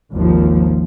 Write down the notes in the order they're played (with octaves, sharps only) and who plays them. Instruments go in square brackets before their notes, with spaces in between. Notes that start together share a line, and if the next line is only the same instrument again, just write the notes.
[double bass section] G#1 D#2 F3